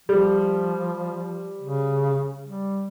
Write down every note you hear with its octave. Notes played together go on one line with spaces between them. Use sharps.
F3 G3
C#3
G3